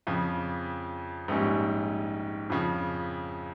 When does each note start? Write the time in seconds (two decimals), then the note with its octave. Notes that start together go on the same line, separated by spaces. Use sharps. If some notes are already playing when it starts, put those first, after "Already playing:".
0.07 F2 C#3 F3
1.28 A#1 G#2 G3 C#4
2.50 F2 C#3 F3